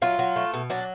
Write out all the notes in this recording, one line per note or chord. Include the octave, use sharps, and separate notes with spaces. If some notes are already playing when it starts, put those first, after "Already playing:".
F#3 F4
F#3
A3
B2
F#3 D4